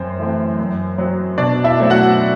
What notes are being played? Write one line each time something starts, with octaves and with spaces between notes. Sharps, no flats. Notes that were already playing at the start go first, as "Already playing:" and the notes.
Already playing: F#2 C4 C5
E3 A3 C4
F#2
F#3 C4
B2 D4 D5
E4 E5
F#3 A3 C4
F#4 F#5